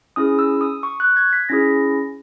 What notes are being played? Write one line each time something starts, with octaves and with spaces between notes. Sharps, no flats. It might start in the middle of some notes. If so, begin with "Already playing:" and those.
C#4 E4 G#4 D#6
E6
D#6
C#6
F#6
G#6
B6
C#4 E4 G#4 A#6